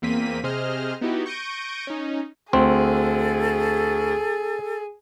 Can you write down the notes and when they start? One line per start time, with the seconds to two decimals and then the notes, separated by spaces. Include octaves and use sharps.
0.02 E2 A#3 C4 B6 D#7
0.43 C3 G#4 C5 D#5 F6
1.01 B3 D#4 E4 F#4 G4
1.26 C#6 G6 A#6 D7 D#7
1.87 C#4 D#4
2.53 D2 C4 G#4 A4